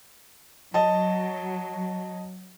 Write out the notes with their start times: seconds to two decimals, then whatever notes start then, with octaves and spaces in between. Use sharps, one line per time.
0.74 F#3 D#5 A5